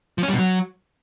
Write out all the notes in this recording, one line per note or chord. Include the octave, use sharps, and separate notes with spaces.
F3
C#4
G3
B2
F#3